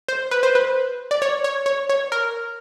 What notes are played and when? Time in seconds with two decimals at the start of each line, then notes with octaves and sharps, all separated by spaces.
0.08 C5
0.31 B4
0.43 C5
0.55 B4
1.11 D5
1.22 C#5
1.44 C#5
1.66 C#5
1.89 C#5
2.12 A#4